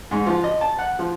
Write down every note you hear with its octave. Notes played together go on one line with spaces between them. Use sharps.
G#2
F3
D#5
A5
F#5
F3